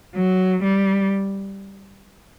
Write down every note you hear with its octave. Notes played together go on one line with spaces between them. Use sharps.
F#3
G3